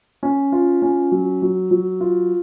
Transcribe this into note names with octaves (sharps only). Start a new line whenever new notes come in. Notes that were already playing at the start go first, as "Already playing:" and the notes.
C#4
F4
C#4
F#3
F#3
F#3
F4